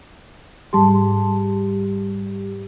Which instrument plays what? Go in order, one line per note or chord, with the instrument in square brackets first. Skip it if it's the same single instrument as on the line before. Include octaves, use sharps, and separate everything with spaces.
[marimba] G#2 A5 C6 [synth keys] G3 G4